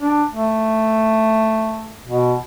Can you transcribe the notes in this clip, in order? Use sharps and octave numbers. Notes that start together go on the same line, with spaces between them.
D4
A3
B2